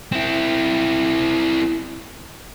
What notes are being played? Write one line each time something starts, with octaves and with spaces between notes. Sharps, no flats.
C4 E4